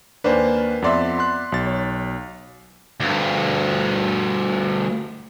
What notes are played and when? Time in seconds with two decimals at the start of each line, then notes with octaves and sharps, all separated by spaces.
0.24 D#2 A#3 D4 B4 C5 G#5
0.82 F2 B3 D5 E5 C6
1.19 C6 F#6
1.52 B1 A6
1.66 C#5
3.00 D2 G2